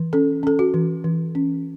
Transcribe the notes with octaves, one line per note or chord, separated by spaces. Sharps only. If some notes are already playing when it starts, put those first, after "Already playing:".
Already playing: E3
C#4 A4
C#4 A4
F#4
E3
E3
C#4